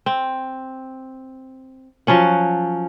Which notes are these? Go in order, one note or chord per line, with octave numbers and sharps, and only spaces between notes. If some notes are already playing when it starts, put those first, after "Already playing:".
C4
F3 F#3 C#4 F#5